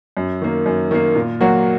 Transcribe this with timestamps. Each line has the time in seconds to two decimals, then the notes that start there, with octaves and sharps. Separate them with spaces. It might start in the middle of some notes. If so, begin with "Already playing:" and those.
0.17 F#2
0.42 D#3 A#3
0.66 F#2
0.91 D#3 A#3
1.15 A#2
1.41 F#3 A#3 F#4